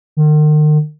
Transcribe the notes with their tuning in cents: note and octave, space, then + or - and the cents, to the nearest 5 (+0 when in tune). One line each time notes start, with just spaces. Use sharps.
D#3 -40